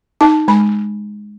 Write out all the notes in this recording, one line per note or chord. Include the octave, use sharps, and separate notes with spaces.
D#4 A5
G#3 B5